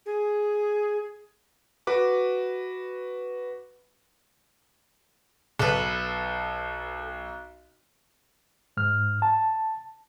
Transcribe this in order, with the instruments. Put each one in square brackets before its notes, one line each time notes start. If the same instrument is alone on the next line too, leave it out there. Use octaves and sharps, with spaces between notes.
[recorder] G#4
[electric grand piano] F#4 B4 D6
[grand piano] B1 [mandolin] A4 B4
[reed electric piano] G#2 F6
A5